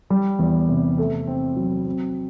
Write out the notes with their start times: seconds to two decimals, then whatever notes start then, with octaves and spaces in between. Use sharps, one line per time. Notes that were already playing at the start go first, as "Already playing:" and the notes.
0.10 G3
0.39 E2
0.69 C3
0.98 A3
1.27 C4
1.56 F#3
1.85 C4